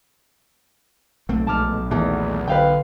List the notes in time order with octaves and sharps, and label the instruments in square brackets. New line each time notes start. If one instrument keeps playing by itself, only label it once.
[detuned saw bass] B1 [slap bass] A3 A#3 C4
[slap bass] A#1 G#3 A3 [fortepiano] A5 D6 F6
[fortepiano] E2 [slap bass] A#2 D#3 A3
[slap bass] D3 [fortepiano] B4 F5 G5